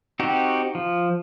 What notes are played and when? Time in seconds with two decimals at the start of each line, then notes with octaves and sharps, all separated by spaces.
0.20 C4 D#4 F#4 G4
0.75 F3